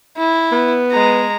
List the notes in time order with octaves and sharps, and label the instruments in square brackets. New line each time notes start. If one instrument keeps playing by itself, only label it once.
[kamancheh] E4
[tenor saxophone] B3
[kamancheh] G#3 A#5